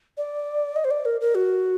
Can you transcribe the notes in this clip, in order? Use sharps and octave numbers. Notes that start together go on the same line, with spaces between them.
D5
D#5
C5
D5
A#4
A#4
F#4